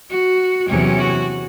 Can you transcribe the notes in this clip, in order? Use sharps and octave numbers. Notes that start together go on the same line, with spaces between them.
F#4
E2 C3 F#3 C#4
F#4